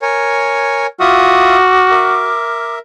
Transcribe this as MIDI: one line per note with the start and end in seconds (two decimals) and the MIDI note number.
0.02 0.87 70
0.02 0.87 73
0.02 0.87 80
1.00 1.57 65
1.00 2.34 66
1.00 1.57 76
1.00 2.74 86
1.00 1.57 87
1.00 2.74 89
1.91 2.79 70
1.91 2.79 76